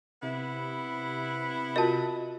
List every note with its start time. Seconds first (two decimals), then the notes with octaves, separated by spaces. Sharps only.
0.22 C3 B3 E4
1.76 F4 F#4 A#4 D#5 A5